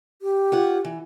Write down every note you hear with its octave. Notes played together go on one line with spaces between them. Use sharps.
G4
F4 C#5 F#5
E3